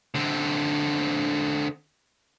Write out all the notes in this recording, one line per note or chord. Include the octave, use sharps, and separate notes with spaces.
D3 C4